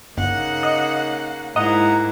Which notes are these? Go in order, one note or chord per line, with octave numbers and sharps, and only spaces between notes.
G1 C#3 A#3 D#4 F#5
D#5
G#2 A#3 E4 D#5 F#5 A#5